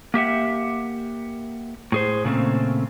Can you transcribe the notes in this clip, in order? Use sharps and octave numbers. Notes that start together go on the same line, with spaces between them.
A#3 G4 E5 F#5
A2 G#4 C5
A#2 C#3 A3 A#3 C4